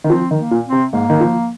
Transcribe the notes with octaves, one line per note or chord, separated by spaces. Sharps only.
D#3
F3 C4
D#3
A#3
A#2
C4
C3
G#2 A#3
D#3
F3